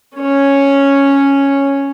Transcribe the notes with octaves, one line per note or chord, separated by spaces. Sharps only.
C#4 C#5